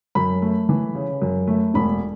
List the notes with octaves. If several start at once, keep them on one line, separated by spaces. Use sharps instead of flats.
F#2 B5
A3
E3
C#3
F#2
A3
E1 B5